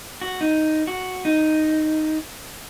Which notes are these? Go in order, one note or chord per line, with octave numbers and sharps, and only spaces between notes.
F#4
D#4
F#4
D#4